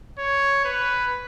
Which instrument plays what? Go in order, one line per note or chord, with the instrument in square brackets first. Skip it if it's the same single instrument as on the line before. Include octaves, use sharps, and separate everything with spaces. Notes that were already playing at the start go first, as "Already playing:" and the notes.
[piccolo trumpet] C#5
B4